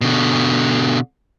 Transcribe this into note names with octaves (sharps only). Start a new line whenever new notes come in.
B2 D3